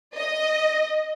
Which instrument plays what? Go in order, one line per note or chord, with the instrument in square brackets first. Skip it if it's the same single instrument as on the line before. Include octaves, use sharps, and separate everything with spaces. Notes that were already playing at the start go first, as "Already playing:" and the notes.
[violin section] D#5